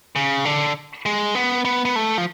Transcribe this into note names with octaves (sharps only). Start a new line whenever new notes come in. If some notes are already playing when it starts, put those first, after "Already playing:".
C#3
D3
G#3
B3
B3
B3
A3
F3